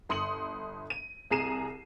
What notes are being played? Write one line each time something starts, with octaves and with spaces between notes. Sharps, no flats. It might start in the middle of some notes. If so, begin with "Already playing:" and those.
G1 C6 D#6 C#7 F#7
D#7
C2 G#4 A#5 C7 D#7 E7